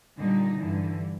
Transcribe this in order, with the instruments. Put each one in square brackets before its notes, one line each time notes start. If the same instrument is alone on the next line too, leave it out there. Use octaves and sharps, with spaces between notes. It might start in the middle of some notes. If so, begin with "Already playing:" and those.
[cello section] A#2 D3 G3 D#4
G2 D3 E3